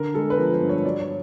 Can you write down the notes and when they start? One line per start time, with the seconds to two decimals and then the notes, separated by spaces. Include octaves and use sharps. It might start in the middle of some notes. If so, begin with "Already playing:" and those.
Already playing: D3 A#4
0.14 G#3 A4
0.30 B4
0.38 F3 A#4
0.53 C5
0.61 G2
0.69 C#5
0.84 F#3 D5
1.00 C#5